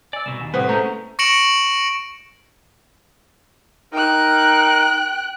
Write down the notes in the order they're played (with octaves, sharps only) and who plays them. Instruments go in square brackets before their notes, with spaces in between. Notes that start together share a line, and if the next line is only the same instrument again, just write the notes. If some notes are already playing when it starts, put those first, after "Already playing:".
[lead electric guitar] D5 [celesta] G#5 E6
[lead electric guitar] C2 B2 [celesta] E7
[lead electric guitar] D#2 [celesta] G#5
[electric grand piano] A2 B4 [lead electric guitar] C3 G3 [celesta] C5 F#5 D#6
[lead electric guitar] G#3 C#4 [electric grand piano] A3 [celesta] A#5 G6
[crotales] C#6 A#6 C#7 D7 E7 F#7
[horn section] D#4 A#4 [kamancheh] G5 F#6